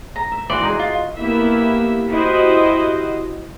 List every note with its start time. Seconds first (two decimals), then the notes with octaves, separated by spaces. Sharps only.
0.16 A#5
0.32 E5
0.50 E3 F#4 D5 C6
0.62 D#4 G#4
0.79 F4
1.17 A#3 B3 E4 G4 E5
2.11 E4 F#4 G4 C5 D#5